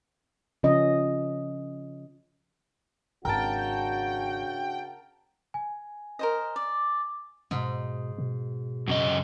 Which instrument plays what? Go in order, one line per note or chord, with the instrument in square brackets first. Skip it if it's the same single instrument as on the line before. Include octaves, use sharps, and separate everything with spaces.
[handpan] C#3 F3 C#4 D#5
[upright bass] G#1 [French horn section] C#3 D4 F#4 [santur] A#4 A5 [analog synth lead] G5
[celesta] G#5
[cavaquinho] A#4 C5 D#5
D5
[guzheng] G#2 [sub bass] B2
[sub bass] B2
[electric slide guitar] F#2 C#3 D#5